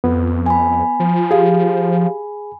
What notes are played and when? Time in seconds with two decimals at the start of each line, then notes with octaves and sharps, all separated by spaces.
0.04 F2 B3
0.46 G#5 B5
1.00 F3
1.31 G4 G#4 F5